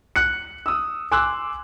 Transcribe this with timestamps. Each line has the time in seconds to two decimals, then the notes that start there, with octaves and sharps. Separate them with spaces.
0.16 F#6 C#7
0.66 D#6 E6
1.11 G#5 C6 D6 E6 F#6